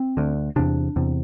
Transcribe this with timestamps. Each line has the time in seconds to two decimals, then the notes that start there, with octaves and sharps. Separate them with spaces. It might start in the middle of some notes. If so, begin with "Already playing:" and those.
Already playing: C4
0.17 D2 D3
0.56 E2 C3 D4
0.96 E2 C3